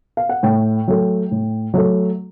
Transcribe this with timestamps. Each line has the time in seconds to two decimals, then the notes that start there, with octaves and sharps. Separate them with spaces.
0.17 F5
0.29 F#5
0.43 A2 G5
0.88 F#3 A3
1.31 A2
1.74 F#3 A3